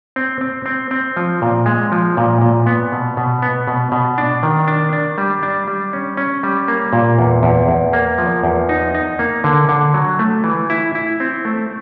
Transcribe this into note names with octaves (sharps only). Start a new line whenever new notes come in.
C4
C4
C4
C4
F3
A#2
G#3
F3
A#2
A#2
B3
B2
B2
B3
B2
B2
D4
D#3
D4
D4
G3
D4
G3
C#4
C#4
G3
A#3
A#2
E2
E2
E2
A#3
F3
E2
D#4
D#4
A#3
D3
D3
F#3
A3
E3
E4
E4
C4
A3